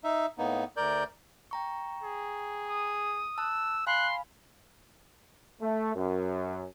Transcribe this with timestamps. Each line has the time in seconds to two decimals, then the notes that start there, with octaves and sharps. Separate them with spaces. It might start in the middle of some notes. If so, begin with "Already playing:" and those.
0.04 D#4 E5
0.38 A2 A#3 B3 D#4
0.77 D2 A#4 D5 G6
1.51 G5 A#5 C#6
2.03 G#4
2.68 D#6
3.38 A5 E6 F#6
3.87 F5 G#5 B5 C6 F#6
5.60 A3
5.95 F#2